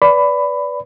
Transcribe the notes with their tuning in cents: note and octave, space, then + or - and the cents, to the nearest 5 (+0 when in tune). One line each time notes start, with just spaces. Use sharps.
B4 +0 D5 -15 B5 +15